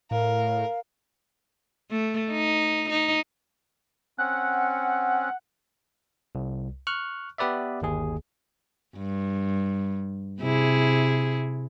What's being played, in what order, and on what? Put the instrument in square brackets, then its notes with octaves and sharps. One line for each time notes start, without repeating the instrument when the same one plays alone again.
[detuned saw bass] A2 [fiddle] A#4 [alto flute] F5
[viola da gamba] A3
D#4
D#4
[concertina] C4 C#4 [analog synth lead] F#5
[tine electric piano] C2
C#6 F6 F#6
B3 G4 B4 D5 E5
G1 D#2 G#4
[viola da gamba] G2
C3 E4 G#4